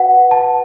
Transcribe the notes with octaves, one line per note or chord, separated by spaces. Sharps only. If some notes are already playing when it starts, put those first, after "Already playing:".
Already playing: F#4 B4 F#5
A5